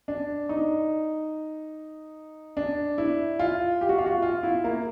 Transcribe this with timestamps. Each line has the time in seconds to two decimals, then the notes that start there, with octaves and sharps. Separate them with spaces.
0.08 D4
0.49 D#4
2.57 D4
2.98 E4
3.39 F4
3.81 G4
3.89 F#4
3.98 F4
4.06 F#4
4.22 F4
4.43 E4
4.64 A#3